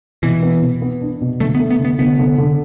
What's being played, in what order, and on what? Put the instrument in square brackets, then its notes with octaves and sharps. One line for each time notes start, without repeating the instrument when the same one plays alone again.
[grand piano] B2 [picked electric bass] E3
[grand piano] B3
B2
B3
D4
B2
[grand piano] D3 [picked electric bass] A3
[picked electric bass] B3
[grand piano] A3
[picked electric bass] B3
[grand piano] D3
[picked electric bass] B3
[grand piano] D3 [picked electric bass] B3
[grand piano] D3
D3